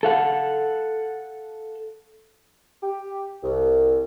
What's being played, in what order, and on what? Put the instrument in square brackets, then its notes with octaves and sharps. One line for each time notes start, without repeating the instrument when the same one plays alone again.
[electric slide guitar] A4 F5 F#5
[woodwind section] G4
C2